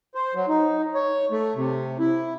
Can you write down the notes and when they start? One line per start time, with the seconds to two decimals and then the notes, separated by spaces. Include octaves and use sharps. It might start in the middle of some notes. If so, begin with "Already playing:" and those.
0.15 C5
0.35 F#3
0.48 D#4
0.95 C#5
1.31 A3
1.55 C3
1.99 E4